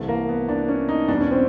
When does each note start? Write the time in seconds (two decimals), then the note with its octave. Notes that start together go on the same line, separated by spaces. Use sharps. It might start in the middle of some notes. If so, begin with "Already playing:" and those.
Already playing: C2 C3 E3 A3
0.08 A#3
0.29 B3
0.49 D4
0.69 C#4
0.88 D#4
1.08 E2 B2 G3 D4
1.21 C#4
1.31 C4